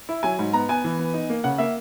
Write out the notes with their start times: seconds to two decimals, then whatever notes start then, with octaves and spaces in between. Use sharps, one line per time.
0.09 E4
0.23 F#3 G#5
0.39 G#2
0.53 B3 A#5
0.69 B3 G#5
0.84 E3
0.99 B3
1.14 D#4
1.29 A#3
1.44 C#3 F#5
1.58 A#3 E5